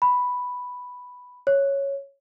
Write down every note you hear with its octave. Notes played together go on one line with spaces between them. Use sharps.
B5
C#5